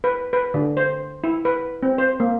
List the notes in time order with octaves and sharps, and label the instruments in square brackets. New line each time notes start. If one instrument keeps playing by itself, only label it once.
[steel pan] B4
B4
D3
C5
E4
B4
C4
C5
A#3